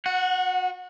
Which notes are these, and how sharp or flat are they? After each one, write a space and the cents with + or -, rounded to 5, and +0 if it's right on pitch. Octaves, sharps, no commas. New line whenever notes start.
F#4 -30 F#5 +0